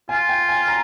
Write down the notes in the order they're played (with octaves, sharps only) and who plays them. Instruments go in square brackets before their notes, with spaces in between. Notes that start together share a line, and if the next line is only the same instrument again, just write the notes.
[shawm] F4 [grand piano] G#5
[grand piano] G5
G#5
A#5